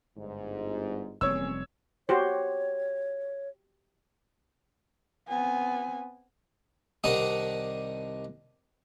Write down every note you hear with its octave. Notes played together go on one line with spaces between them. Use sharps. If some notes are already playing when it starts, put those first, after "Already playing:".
G1 G#2
F1 E2 A#2 G3 C4 C#4 C#5 E6
F#4 G4 C5 C#5
B3 C4 G#5
C2 D#3 D4 D#4 F#5 D#6